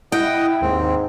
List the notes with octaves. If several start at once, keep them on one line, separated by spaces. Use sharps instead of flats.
E4 D#5 F#5 G5 D#6
D#2 G#2 C4